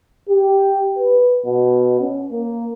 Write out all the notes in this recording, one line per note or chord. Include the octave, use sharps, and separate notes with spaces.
G4
B4
B2
C#4
A#3